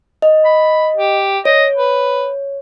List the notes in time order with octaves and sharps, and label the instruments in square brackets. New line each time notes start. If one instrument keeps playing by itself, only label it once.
[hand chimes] D#5
[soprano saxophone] B5
G4
[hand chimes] C#5 [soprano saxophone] D#5
[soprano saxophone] B4